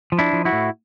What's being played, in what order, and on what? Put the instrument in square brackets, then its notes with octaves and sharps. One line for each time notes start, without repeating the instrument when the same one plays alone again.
[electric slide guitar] F3
D4 E4
F3
E4 F#4
A2